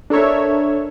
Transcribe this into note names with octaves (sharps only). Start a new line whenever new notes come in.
D4 A4 A#4 C#5 E5